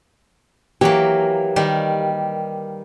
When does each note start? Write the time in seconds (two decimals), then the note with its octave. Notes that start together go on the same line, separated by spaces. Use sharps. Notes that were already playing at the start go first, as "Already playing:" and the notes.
0.81 E3 F#3 A#3 G4
1.56 D#3 G3